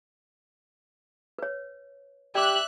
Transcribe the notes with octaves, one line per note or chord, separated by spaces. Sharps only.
B4 C#5
G4 D5 E5 D6 F#6